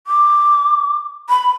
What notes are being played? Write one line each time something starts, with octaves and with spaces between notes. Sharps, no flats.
D6
B5